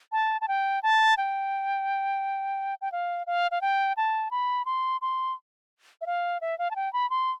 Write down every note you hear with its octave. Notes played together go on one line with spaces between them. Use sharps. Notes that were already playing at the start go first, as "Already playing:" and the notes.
A5
A5
G5
A5
G5
G5
F5
F5
F5
G5
A5
B5
C6
C6
E5
F5
E5
F5
A5
G5
B5
C6